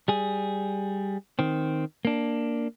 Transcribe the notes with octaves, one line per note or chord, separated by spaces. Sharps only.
G3 G#4
D#3 C4
A#3 D4